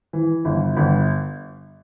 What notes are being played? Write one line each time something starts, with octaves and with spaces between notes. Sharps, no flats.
E3
G1
G1